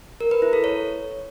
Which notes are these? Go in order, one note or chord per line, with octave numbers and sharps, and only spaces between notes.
A#4
B4
E4
A4
C#5